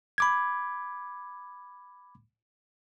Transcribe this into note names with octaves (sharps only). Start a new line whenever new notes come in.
B5 D6 G#6